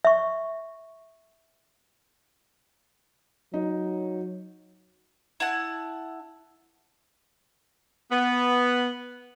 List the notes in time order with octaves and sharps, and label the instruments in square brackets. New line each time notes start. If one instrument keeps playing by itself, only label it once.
[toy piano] E5 C#6
[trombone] F#3 [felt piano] D#4
[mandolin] E4 F#5 A5
[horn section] B3